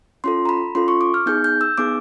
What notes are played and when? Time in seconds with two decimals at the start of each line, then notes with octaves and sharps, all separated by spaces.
0.24 C#4 F4 A4 C6
0.45 A#5
0.49 B5
0.75 C#4 F4 A4 C6
0.88 C#6
1.01 D6
1.14 F6
1.26 B3 D#4 G#4 G6
1.44 G6
1.61 E6
1.78 B3 D#4 G#4 D6